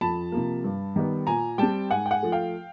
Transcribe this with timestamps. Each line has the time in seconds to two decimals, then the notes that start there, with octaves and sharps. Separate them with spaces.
0.01 F2 A5 B5
0.32 C3 F3 A#3
0.64 G2
0.96 D#3 G3 B3
1.27 A#2 G#5 A#5
1.58 G3 C4 G5 A5
1.91 G#2 F#5 G#5
2.06 G5
2.11 F#5 G#5
2.23 F3 A3
2.32 F5 G5